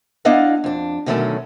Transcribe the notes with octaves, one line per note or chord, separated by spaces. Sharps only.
B3 D4 E4 D#5 F5 F#5
F2 D4
B2 D3 D#3 F#3 A3 C#4